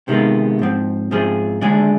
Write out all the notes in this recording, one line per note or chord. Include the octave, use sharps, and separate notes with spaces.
C3 D#3 G#3 B3 F4
G#2 F3 C4
G#2 F3 C4 F4 G#4
D#2 D3 G#3 D4 G#4